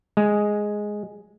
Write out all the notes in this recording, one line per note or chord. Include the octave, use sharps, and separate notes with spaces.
G#3